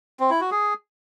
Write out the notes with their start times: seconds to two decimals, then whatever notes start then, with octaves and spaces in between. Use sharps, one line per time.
0.20 C4
0.30 E4
0.41 F#4
0.51 G#4